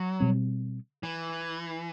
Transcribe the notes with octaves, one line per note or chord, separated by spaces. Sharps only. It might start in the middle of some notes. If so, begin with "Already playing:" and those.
Already playing: F#3
B2 G3 C4
E3